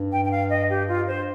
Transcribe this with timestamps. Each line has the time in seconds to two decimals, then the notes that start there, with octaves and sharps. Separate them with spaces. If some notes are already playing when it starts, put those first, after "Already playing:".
Already playing: G2
0.12 G5
0.25 G5
0.31 F5
0.50 D#5
0.70 G4
0.88 F4
1.07 C5